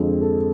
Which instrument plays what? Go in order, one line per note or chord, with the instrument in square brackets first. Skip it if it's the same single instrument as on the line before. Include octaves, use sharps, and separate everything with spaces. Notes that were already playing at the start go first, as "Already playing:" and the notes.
Already playing: [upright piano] F2 D3 F3 G#3
A4